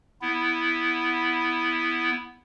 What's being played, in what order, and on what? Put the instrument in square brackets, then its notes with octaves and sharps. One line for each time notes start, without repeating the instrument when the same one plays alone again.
[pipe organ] B3 E4